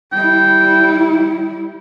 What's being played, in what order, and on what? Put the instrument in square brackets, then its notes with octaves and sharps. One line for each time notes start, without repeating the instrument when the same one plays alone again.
[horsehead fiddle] G3 E4 [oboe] G5